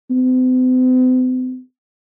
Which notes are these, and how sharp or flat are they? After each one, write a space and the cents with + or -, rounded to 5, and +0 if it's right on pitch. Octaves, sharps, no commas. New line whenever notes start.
C4 -45